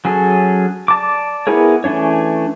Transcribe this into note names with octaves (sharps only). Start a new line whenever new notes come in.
F#3 C#4 G#4 A4
D5 A5 D6
B3 E4 G#4 A#4 C#5
E3 A3 C#4 D4 C#5